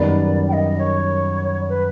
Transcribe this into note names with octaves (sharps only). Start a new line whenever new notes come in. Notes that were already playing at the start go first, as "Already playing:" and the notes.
Already playing: F#2 D#3 G3 B3 D5
G5
D#5
C#5
B4